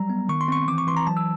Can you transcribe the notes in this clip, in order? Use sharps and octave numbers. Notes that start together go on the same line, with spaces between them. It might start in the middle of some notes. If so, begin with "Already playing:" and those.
Already playing: F#3 G3 A#5
B3
D#3 C#6
C6
C4 C#6
E3 D6
C#6
E3 C6
A#5
F#3 A5
E6